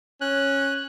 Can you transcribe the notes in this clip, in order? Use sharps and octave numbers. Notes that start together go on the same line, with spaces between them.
C#4 F#6